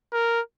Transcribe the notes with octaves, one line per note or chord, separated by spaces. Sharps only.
A#4